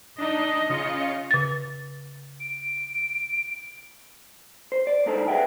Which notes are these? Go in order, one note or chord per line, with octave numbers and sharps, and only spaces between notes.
D4 D#4 D#5
C#3 F4 C#7
C#3 A6
D7
C5
D5
G#2 D3 D#4 A4 C5
G#4 B4 E5 F#5 G5